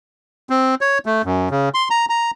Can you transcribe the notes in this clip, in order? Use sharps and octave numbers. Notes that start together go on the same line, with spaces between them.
C4
C#5
A3
F#2
C#3
C6
A#5
A#5